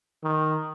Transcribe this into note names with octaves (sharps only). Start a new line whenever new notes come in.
D#3